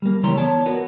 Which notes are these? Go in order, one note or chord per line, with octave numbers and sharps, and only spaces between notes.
G3 A#3
C#2 E3 G3 C#5 A#5 C6
B3 C#5 D5 A5
B3 F#4 A#4